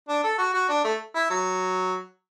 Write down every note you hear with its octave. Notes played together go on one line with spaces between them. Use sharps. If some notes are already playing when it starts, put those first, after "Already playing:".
D4
A4
F#4
F#4
D4
A3
E4
F#3